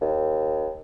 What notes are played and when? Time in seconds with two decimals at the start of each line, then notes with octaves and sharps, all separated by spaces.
0.01 D#2